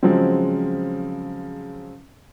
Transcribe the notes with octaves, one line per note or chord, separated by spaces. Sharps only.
C#3 F3 F#3 G#3 C4